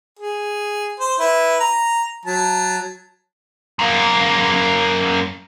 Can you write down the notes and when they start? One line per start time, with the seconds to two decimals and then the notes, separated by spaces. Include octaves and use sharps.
0.19 G#4
1.00 C5
1.20 E4 B4
1.60 A#5
2.26 F#3 A5
3.79 F#2 A#3